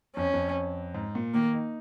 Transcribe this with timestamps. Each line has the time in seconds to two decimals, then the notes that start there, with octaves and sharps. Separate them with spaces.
0.16 F2 C#4
0.34 F2
0.94 G#2
1.15 A#2
1.34 D#3 A#3
1.53 D#4